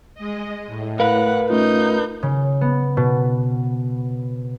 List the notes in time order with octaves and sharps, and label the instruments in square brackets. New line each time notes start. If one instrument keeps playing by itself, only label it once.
[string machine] G#3 D#5
A2
[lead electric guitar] A#4 B4 [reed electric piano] F5 [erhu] F#5
[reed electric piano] A3 C#4 F4 [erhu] D#4 [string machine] G6
[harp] C#3
B3
B2